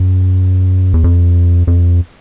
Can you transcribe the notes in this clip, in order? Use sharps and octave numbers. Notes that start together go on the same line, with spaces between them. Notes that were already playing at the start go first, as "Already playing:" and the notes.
Already playing: F#2
E2
F2
F2